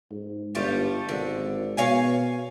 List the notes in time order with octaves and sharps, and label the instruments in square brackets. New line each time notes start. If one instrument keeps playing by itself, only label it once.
[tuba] G#2
[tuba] G1 [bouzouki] G3 A3 F4
[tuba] G#1 [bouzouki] D3
[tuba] B2 [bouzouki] C#5 F5 G#5